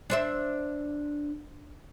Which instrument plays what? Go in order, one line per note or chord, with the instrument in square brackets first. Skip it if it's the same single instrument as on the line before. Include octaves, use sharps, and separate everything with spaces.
[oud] D4 C5 E5